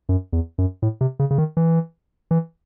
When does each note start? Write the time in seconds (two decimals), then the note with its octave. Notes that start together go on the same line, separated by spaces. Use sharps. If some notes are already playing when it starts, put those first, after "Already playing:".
0.09 F#2
0.33 E2
0.58 F#2
0.82 A2
1.01 C3
1.19 C#3
1.31 C#3
1.38 D#3
1.57 E3
2.31 E3